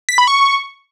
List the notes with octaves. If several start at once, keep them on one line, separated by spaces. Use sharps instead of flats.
B6
B5
C#6